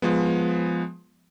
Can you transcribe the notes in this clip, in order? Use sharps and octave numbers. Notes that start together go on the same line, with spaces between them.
F3 G#3 B3